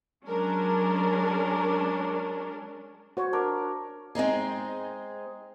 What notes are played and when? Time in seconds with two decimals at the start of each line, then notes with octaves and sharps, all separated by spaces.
0.25 F#3 G#3 C#4 D4 A#4
3.17 F#4 C5 C#5
3.33 D4 A#4
4.15 G#3 C4 D#4 G#4